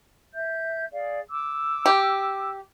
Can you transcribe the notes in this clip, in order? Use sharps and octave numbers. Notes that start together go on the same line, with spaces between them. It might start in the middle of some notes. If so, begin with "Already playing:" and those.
E5 G6
G#4 D5 F5
D6 E6
G4